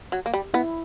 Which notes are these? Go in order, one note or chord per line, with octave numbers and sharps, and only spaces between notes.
F#3
A#3
G3
B3 E4